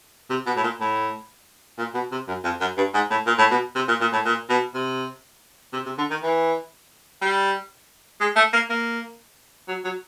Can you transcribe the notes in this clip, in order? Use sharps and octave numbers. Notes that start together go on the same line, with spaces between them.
C3
B2
A2
A#2
A2
A#2
B2
C3
F#2
F2
F#2
G2
G#2
A2
A#2
A2
B2
C3
A#2
A#2
A2
A#2
B2
C3
C3
C3
D3
D#3
E3
G3
G#3
A3
A#3
A#3
F#3
F#3